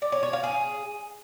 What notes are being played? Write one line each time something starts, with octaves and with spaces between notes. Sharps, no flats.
D5
C#5
C#5
F5
G#4